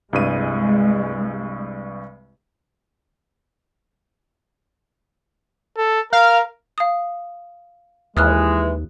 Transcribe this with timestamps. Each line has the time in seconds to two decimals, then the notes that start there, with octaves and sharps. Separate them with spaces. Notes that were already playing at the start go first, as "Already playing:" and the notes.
0.13 C2 G2 G#3 D#7
5.77 A4
6.13 A#4 F5
6.78 F5 D#6
8.17 D#2 E3 G#3 D#6 F6 F#6